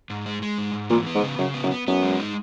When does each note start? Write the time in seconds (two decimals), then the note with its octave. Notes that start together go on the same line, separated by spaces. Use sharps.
0.10 G#2
0.26 G#3
0.42 G#3
0.58 G#2
0.73 G#2
0.90 A#2 E3
1.07 B3
1.15 G#2
1.23 C#3
1.38 F#2 C#3
1.54 B3
1.63 F#2
1.71 B3
1.87 F#2 B3
2.03 G#3
2.20 D#4